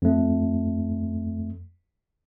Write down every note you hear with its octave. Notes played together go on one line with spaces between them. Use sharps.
F2 A3